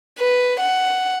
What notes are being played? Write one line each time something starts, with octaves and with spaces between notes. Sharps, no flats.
B4
F#5